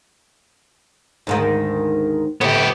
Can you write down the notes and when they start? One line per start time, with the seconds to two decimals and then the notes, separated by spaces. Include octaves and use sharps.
1.27 D2 G#2 D#3
2.41 A2 E3 B3 G4